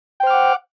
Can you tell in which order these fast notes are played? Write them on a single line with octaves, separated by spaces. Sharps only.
G5 C5 F6 D6 F#5